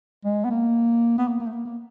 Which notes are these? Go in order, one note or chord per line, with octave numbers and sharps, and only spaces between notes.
G#3
B3
A#3
B3
A#3
A#3
A3
A#3
A#3